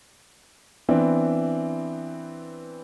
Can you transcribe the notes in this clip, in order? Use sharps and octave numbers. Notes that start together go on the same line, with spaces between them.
E3 B3 C4 D4